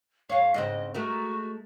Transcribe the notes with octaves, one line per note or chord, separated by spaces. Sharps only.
F2 C#5 F5
G#2 C#3 C4 D#5
G#3 A3 F#4 A#4